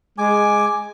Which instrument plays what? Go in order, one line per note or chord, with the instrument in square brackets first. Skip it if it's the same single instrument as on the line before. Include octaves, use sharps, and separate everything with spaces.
[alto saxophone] G#3 [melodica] G#5 D6